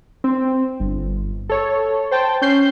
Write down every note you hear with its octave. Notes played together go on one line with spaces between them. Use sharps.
C4
G1
A4 C#5
C5 G5 A5
C#4 G6 C7